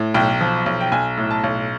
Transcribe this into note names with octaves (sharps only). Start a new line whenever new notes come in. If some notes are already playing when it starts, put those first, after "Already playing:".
Already playing: A2
B1 G5
F3
B1
G5
B1 G#5
A2
A5
B1